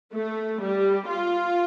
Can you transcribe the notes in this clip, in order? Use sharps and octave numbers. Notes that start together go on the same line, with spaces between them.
A3
G3
F4